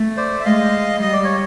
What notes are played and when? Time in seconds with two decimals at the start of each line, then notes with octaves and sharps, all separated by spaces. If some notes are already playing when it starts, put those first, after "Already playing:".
Already playing: A3
0.17 C5 D5
0.40 E5
0.45 G#3 D#5 F5
1.02 G3 D#5
1.13 D5
1.24 C#5